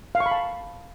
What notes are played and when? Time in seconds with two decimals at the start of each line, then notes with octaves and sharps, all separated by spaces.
0.15 F5
0.20 C#6
0.26 B5
0.31 A5